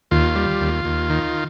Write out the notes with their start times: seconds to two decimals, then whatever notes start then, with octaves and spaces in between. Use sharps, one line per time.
0.11 D#2 F4
0.35 G3
0.61 D#2
0.85 D#2
1.10 D#3